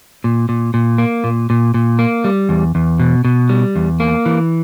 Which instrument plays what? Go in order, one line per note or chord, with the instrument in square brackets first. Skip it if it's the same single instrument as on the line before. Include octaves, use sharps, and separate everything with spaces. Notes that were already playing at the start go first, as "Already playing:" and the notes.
[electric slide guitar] A#2
A#2
A#2
A#3
A#2
A#2
A#2
A#3
G3
E2
E2
B2
B2
G3
E2
A#3
E3